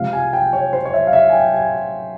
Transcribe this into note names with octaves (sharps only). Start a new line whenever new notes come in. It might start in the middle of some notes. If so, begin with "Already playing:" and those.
Already playing: C3 F3 G#3 C4 F5
G#5
G5
C#5
C5
C#5
E5
F5
E5
G#5
G5
G#5